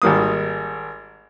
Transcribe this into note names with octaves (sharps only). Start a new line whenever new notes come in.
G#1 G3 A#3 D#6